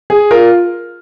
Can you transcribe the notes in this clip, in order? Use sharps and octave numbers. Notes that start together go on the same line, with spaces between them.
G#4
F4 A#4